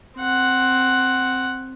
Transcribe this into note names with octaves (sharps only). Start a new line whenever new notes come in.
C4 F#5